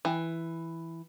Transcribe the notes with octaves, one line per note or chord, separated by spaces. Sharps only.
E3